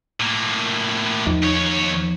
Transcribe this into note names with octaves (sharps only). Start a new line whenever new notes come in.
A2 A#3
E2 F3 D#4
D#2 C#5